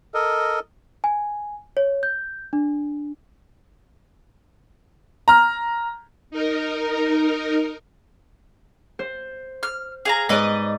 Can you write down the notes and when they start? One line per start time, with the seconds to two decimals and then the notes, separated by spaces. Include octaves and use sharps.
0.14 A4 A#4 D#5
1.04 G#5
1.77 C#5
2.03 G6
2.53 D4
5.28 A#5 F6
6.31 D#4 A#4
8.99 C5
9.63 F6
10.05 G#4 F5 A#5
10.29 G#2 B4 D5 D#5